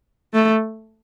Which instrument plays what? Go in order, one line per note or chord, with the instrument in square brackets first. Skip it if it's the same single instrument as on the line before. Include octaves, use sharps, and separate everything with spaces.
[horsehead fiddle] A3